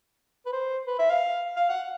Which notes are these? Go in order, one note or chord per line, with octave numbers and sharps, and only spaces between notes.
B4
C5
B4
E5
F5
F5
F#5